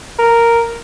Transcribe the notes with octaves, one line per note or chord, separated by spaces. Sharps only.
A#4